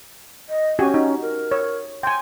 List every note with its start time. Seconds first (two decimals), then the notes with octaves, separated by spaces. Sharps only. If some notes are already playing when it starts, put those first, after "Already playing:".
0.49 D#5
0.79 C#4 F#4 G4 G#5
0.94 D#4
1.22 A#4
1.51 C#5
2.03 G5 G#5 C6